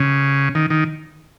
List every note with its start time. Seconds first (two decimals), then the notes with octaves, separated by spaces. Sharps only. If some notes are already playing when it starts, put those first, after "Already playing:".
Already playing: C#3
0.55 D#3
0.70 D#3